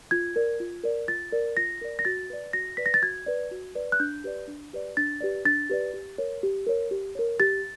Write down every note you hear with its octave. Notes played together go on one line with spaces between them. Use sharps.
F4 G#6
A#4 D5
F4
A#4 D5
F4 A6
A#4 D5
F4 A#6
A#4 D5
A#6
F#4 A6
B4 D5
F#4 A#6
B4 D5 B6
A#6
A6
F#4 G#6
B4 D5
F#4
B4 D5
F#6
D4 G6
G4 B4 D5
D4
G4 B4 D5
D4 A6
G4 B4 D5
D4 A6
G4 B4 D5
G4
A#4 C#5
G4
A#4 C#5
G4
A#4 C#5
G4 A6